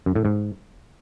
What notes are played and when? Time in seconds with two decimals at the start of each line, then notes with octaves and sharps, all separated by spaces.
0.06 F#2
0.15 A2
0.25 G#2